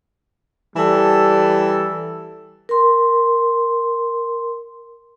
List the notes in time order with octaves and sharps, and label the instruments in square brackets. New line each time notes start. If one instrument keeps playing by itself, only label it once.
[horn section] E3 G3 A4
[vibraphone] A#4 C6